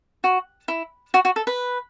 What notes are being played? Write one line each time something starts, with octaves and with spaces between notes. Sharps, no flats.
F#4
E4
F#4
F#4
A4
B4